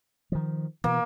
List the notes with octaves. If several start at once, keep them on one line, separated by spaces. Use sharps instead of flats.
D#3 F3
B2 E3 A#3